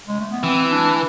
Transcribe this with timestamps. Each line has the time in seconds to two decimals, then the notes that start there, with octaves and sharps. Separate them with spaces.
0.08 G#3
0.20 A3
0.32 B3
0.43 E3 C4
0.71 D4